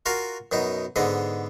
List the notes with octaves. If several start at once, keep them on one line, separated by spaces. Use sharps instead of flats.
F4 F#4 A#4 F5
F#2 B2 D#4
G#2 D3 B3 D#5